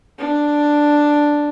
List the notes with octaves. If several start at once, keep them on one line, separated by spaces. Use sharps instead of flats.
D4